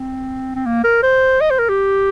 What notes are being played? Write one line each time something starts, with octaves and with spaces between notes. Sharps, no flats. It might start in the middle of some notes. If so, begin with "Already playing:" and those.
Already playing: C4
C4
A#3
A#4
C5
D#5
C5
A#4
G4